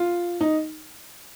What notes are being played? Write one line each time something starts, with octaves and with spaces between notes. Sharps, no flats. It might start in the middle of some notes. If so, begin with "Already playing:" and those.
Already playing: F4
D#4